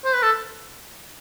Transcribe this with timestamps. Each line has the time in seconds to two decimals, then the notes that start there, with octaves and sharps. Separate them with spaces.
0.04 C5
0.14 B4
0.22 A4